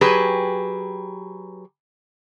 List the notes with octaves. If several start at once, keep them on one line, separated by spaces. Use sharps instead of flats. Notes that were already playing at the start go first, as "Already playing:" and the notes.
F#3 G4 G#4 B4